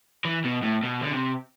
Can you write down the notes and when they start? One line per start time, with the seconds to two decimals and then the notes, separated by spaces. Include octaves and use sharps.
0.25 E3
0.45 B2
0.64 A2
0.84 B2
1.03 D3
1.12 C3